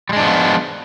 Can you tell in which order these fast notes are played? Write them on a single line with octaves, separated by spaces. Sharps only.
G3 G#3 D4 F3 B3